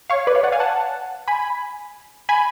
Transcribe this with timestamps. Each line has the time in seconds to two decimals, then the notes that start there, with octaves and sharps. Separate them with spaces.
0.10 C#5 F5
0.27 B4 D5
0.35 C#5 F5
0.43 D5 F#5
0.52 F5 G#5
0.60 F#5 A5
1.28 G#5 B5
2.29 G#5 B5